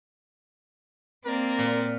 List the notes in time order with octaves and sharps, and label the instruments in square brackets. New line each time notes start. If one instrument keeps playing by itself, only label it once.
[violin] A#3 D5 [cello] C4 [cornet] A#4
[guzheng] A#2